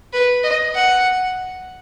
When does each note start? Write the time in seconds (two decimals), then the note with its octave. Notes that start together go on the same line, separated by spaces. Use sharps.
0.13 B4
0.43 D#5
0.75 F#5